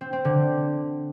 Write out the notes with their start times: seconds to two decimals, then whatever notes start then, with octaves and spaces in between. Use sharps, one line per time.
0.01 C4
0.13 C4
0.25 D3